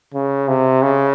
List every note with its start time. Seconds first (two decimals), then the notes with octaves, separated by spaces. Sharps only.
0.14 C#3
0.48 C3
0.82 C#3